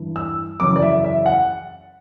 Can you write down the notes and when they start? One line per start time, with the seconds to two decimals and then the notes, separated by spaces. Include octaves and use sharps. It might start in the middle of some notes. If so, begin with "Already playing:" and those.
Already playing: G2 E3
0.16 E6
0.60 F#2 C#3 E3 D6
0.76 D5
0.82 E5
1.04 E5
1.26 F#5